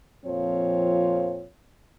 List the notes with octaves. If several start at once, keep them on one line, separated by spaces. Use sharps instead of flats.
F2 A#2 F3 C4 F4 C#5